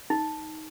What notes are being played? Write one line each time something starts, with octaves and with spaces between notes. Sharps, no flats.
D#4